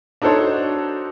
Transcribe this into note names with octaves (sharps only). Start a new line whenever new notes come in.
D4 D#4 F#4 A4 C5 C#5